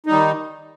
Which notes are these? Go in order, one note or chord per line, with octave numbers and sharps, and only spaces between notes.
D#3 G3 D#4